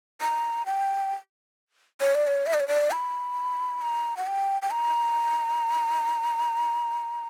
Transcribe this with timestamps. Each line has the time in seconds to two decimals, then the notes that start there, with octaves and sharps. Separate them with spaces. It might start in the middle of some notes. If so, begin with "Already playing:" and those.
0.21 A#5
0.66 G5
2.01 C#5
2.15 D5
2.27 C#5
2.46 E5
2.54 D5
2.60 C#5
2.68 D5
2.91 B5
3.81 A#5
4.17 F#5
4.27 G5
4.62 G5
4.71 A#5